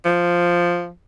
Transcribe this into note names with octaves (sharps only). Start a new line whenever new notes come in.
F3